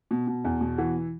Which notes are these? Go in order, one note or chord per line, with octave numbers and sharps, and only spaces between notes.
B2
B2
E2
B2
E3 F#4